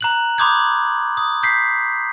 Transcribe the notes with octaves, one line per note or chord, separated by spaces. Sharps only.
A#5 F#6 F#7
B5 C6 D6 D#6 G6 G#6
D#6
G6 B6 C7